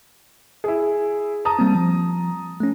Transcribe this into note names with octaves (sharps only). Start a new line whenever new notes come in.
E4 G#4
A5 A#5 D#6
G3 A#3 C4
F3
A3 C#4